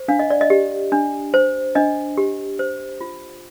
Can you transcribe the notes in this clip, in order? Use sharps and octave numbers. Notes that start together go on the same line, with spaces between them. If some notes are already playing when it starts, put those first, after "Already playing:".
Already playing: C5
D4 F5
D#5
D5
D#5
G4
D4
C5
D4 D#5
G4
C5
F4